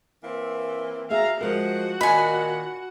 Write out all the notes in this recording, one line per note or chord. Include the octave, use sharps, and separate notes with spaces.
E3 A#3 C4
F#4 G#4 E5 F5 A#5
F3 G#3 F#4 A#4 F#5
A#2 D#3 D#5 G#5 B5